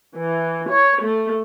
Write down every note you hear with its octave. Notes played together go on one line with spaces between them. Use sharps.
E3
C#5
A3